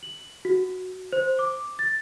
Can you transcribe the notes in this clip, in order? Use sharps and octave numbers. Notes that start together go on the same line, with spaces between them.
F#7
F#4
C5
D6
A6